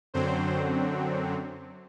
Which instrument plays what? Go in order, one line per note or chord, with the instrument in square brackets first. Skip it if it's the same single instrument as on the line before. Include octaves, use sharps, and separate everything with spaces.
[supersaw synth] F#2 D3 F#3 C4 C5